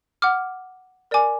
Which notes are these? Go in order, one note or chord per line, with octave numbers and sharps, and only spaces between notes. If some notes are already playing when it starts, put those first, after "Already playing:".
F#5 D6 F6
A#4 D5 G#5 D6